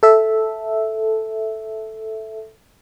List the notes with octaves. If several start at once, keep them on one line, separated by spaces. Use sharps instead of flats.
A4 E5